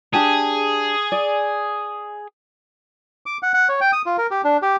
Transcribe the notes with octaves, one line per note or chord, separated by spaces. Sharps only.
D4 G4 G#4 A5
D5
D6
F#5
F#5
C#5
G5
D#6
F4
A#4
G4
D4
G4